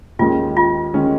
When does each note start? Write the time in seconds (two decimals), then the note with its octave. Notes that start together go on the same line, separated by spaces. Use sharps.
0.19 D#2 D#3 G#3 C#4 F4
0.57 F4
0.94 D#3 G#3 C#4